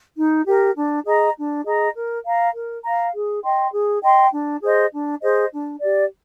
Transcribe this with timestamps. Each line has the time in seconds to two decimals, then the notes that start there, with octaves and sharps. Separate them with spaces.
0.17 D#4
0.46 G4 A#4
0.76 D4
1.05 G#4 D#5 A#5
1.36 D4
1.65 G#4 D#5 A#5
1.95 A#4
2.24 F5 A#5
2.54 A#4
2.83 F5 A#5
3.14 G#4
3.43 D#5 G5 C6
3.73 G#4
4.02 D#5 G5 C6
4.33 D4
4.62 G#4 C5 D#5
4.92 D4
5.22 G#4 C5 D#5
5.52 D4
5.81 G4 D5